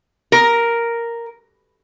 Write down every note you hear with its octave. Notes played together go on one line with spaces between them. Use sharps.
A#4